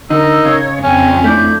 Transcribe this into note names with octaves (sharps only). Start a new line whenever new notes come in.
D3 D#4 A#4 E6
C#3 C#5
F2 C#4 G5 G#5
A3 D4 E4 G6